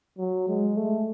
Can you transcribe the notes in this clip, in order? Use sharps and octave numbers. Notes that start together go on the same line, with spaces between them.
F#3
G#3
A3